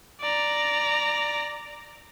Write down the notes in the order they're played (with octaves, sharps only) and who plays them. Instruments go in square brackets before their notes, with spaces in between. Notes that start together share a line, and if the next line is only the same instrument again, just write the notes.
[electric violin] D5 A#5